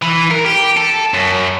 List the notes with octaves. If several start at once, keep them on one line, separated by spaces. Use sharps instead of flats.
E3
A#4
G4
A4
F#2